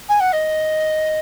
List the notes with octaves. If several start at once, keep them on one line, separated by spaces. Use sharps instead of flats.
G#5
F#5
D#5